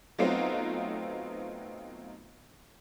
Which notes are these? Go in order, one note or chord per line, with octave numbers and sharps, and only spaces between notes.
F#3 A3 B3 C4 D#4 F4